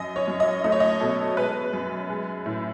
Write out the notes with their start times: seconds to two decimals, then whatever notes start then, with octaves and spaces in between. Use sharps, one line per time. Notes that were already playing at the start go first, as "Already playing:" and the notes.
Already playing: F#2 D#5
0.16 C#5
0.28 F#2
0.40 D#5
0.64 A3 D#5
0.72 C#5
0.80 D#5
1.01 B2 A4
1.37 G#3 B4
1.73 F#2
2.10 G#3
2.46 A2